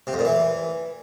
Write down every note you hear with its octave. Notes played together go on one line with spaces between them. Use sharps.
C3
F2
A#2
E3